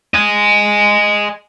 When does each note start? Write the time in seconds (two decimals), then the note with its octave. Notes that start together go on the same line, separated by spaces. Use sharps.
0.14 D#5 G#5